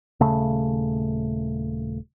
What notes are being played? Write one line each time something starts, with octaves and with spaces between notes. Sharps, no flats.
D#1 C#3 A3